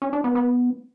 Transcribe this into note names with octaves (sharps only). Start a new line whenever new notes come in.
C#4
D4
B3
B3